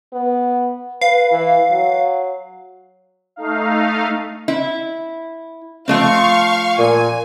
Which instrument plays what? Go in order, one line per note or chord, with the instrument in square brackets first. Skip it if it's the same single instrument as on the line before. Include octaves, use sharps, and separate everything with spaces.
[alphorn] B3
[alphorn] B4 [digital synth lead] F5
[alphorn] E3
F#3
[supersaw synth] A3 D#4 F5
[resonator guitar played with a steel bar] E4
[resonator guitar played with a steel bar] F3 A3 C4 [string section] F5 C#6
[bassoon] A#2 [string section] G#5